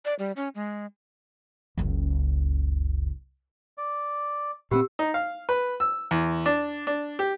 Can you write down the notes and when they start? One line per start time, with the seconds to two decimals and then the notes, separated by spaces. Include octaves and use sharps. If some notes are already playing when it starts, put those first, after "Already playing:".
0.05 D5
0.19 G3
0.36 C#4
0.55 G#3
1.78 F#1 C#2
3.78 D5
4.71 A#2 A#3 C4 G4 B4 E5 F#5 E6
4.99 D#4
5.14 F5
5.49 B4
5.80 E6
6.11 E2
6.46 D4
6.87 D4
7.19 G4